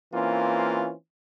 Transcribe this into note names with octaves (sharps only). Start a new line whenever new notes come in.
E3 A#3 C4 C#4 F4